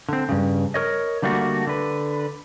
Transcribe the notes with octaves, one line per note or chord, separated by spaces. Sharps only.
D3 C4
G2 C#3
A#4 C#5 D#5
D3 G3 A3 A#3 F#4
D3 B4